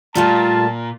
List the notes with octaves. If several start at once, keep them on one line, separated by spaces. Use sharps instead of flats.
A#2 G3 A3 A#3 F4 A5